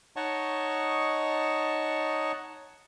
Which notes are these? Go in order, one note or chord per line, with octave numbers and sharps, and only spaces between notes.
D#4 C#5 D#5 F#5 A5 C#6